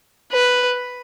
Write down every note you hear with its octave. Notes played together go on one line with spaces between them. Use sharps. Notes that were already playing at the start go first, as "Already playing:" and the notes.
B4